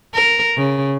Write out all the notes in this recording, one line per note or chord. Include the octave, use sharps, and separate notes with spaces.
A#4
C#3